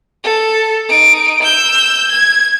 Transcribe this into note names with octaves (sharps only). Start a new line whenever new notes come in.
A4
D#4 D7
E6 G6
G#6